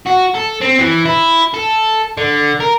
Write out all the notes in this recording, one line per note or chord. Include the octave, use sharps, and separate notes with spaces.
F#4
A4
C4
E3
E4
A4
D3
A#4